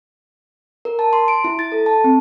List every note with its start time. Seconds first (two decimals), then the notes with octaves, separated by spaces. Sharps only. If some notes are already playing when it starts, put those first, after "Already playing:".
0.85 A#4
0.99 A5
1.13 C6
1.28 D7
1.44 E4
1.59 A6
1.72 A4
1.86 A5
2.04 C4